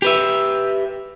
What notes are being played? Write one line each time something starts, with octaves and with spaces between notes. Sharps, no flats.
G4 B4 E5